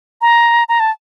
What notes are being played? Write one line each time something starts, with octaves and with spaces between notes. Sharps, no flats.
A#5
A#5
A5